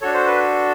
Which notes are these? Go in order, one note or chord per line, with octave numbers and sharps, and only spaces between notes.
D4 F#4 A4 C#5
C5
B4